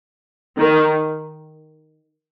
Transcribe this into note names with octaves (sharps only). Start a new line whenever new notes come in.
D#3